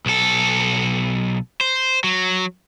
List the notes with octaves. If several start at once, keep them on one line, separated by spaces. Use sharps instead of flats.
B1 A4
C5
F#3